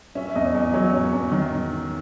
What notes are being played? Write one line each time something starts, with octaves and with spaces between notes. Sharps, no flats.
C#4 E5
E5
E2 D#5
C#5
E2 D#5
F#3 C#5
C#4 C#5
E2
D#3